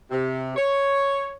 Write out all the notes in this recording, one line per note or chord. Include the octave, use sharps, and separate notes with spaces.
C3
C#5